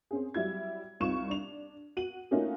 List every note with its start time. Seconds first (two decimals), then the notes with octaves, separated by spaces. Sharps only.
0.11 C4 C#4 G#4
0.34 F#3 G3 E4 G#6
1.00 C2 C4 D#4 F4 C#6 E7
1.29 D4 F7
1.97 F#4 D#7 F#7
2.31 A3 A#3 C#4 D#4 F4 F#4